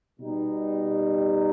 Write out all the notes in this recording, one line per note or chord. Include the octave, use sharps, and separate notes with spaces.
B2 G3 D#4